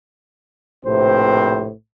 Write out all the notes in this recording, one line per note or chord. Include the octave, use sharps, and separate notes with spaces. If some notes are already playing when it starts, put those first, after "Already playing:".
A#1 A2 C3 C4 B4 C5